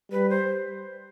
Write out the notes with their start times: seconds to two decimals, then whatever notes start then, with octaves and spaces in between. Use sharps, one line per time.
0.11 G3 B4
0.29 C5